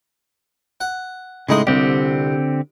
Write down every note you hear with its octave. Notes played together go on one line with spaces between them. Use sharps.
F#5
A2 C#3 G#3 D#4 C6
C2 D3 C4 G4